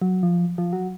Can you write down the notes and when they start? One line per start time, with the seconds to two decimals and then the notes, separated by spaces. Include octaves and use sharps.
0.02 F#3
0.23 F3
0.58 F3
0.73 F#3